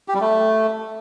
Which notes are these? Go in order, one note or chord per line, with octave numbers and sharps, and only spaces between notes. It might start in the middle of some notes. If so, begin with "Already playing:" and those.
G4
G3
A3